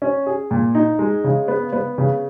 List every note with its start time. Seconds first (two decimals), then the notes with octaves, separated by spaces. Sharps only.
0.02 C#4
0.26 G#4
0.51 A#2
0.75 D#4
0.99 G#3
1.24 C#3
1.48 B3
1.73 B3
1.98 C#3